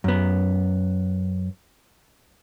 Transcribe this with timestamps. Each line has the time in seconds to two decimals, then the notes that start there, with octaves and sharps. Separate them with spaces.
0.04 F#2 B3